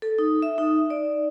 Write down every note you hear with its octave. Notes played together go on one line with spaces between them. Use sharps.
A4
D#4
E5
D#4
D5